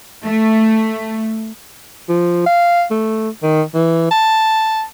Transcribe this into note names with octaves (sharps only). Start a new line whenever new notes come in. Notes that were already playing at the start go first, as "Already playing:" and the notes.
A3
F3
F5
A3
D#3
E3
A5